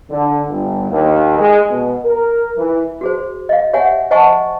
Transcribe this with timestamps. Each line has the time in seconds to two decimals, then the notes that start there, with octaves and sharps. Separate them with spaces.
0.10 D3
0.50 G1
0.90 D#2
1.38 G#3
1.71 B2
2.05 A#4
2.57 E3
3.01 F#4 G#4 C5
3.49 D#5 F5
3.73 G4 C#5 E5 F#5 G#5
4.11 C5 D#5 F#5 G#5 A5 C#6